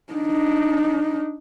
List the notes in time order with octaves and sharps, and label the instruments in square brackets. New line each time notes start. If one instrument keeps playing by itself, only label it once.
[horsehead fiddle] D4 D#4